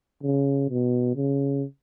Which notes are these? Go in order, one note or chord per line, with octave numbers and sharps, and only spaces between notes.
C#3
B2
C#3